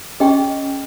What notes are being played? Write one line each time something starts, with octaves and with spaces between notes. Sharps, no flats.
C#4 G#4 D#5 G5 C#6